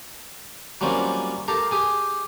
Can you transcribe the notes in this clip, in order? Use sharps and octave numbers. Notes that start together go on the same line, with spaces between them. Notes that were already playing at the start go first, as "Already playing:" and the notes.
F#3 G3 A#3 C4 C#4 F4
G4 A4 A#4 F5
G4 G#4